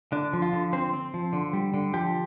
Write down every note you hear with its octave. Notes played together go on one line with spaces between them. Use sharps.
D3 D4
F3
F4
D3
C4 C5
C4
F3
D3
G3
D3
F3 G4